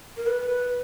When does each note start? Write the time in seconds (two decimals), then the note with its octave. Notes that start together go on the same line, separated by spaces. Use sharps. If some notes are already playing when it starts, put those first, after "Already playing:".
0.17 A#4
0.26 B4